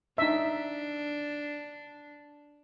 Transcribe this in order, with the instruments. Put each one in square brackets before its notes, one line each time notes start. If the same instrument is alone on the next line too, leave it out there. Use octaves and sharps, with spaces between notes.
[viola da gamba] D4 [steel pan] D#4 E5